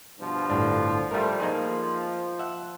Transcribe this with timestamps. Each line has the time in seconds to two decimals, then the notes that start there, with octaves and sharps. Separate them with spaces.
0.19 G2 B2 F3
0.50 G1 A2 D4
1.11 F3 G3 A3 A#4 F5
1.40 F3 A#3 D#4 G#4
2.39 E5 F#5